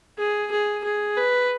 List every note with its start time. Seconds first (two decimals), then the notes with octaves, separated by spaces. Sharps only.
0.18 G#4
0.52 G#4
0.84 G#4
1.17 B4